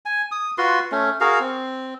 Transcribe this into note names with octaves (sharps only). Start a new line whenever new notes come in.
G#5
D#6
F4 F#4 B4 C6
A3 C#4
F#4 G#4 A#4 F5
C4